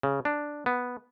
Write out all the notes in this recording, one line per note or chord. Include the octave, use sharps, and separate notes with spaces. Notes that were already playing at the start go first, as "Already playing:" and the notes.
C#3
D4
B3